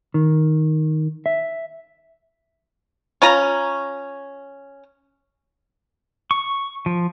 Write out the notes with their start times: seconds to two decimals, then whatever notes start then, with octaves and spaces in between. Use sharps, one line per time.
0.14 D#3
1.26 E5
3.22 C#4 F4 A#5
6.31 C#6
6.86 F3